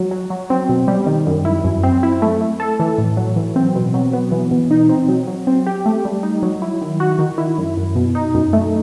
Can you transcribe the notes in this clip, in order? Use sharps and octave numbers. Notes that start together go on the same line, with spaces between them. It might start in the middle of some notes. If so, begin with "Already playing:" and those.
Already playing: F#3
F#3
F#3
C4
B2
G3
D#3
F#2
E4
F#2
C4
E4
A3
A3
A4
E3
A2
F#3
E3
C4
B2
F#3
B3
E3
B2
D#4
C4
F#3
F#3
C4
G4
A3
G3
D#4
F#3
E4
D#3
F#4
D#3
E4
F#2
F#2
B2
D#4
F#2
A3